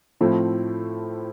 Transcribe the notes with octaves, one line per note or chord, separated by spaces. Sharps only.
A2 F3 A3 C4 E4